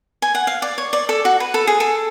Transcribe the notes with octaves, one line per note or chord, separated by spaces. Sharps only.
G#5
F#5
F5
D5
C#5
D5
A4
F#4
B4
A4
G#4
A4